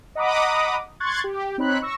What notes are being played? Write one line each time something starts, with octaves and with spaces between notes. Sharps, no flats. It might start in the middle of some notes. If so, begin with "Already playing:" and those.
D#5 F#5 A#5 B5 D6 D#6
C6 C#6 F#6 G#6 A6
G4
C4 D#4 C#5 B5 F#6
C#6 E6 A#6